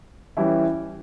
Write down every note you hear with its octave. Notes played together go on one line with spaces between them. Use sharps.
E3 G3 C#4 E4